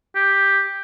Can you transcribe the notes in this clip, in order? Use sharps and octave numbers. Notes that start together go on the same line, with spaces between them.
G4